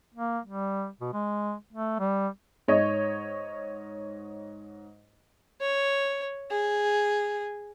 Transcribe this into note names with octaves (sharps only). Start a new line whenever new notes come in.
A#3
G3
B2
G#3
A3
G3
G#2 C#5 D#5
C#5
G#4